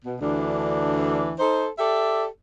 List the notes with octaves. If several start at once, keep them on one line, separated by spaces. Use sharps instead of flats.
B2
D2 E3 D4
D#4 A4 C5
G4 A4 D5 E5